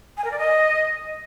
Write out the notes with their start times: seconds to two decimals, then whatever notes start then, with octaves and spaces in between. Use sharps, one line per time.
0.17 G#5
0.24 A#4
0.32 D5
0.39 D#5